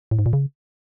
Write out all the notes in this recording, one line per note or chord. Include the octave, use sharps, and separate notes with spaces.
A2
G#2
A#2
C#3